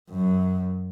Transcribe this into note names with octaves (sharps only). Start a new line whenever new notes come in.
F#2